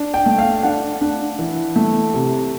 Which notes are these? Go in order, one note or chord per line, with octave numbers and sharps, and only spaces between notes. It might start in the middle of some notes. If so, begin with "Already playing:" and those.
Already playing: D4
G5
A3
F5
D4 F#5
D4
E3
A3
C3